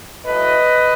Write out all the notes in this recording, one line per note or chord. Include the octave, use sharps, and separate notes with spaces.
A2 F#3 A3 B4 D#5